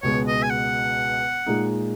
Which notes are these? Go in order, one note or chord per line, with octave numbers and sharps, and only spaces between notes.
C#2 B2 G#3 B3 C#5
D#5
G#5
F#5
A#2 G#3 D#4